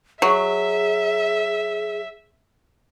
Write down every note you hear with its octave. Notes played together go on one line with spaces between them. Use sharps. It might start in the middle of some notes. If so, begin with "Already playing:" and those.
F#3 G#4 E5